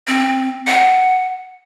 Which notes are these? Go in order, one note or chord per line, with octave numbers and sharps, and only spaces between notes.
C4
F#5